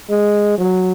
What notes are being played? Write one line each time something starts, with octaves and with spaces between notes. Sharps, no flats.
G#3
F#3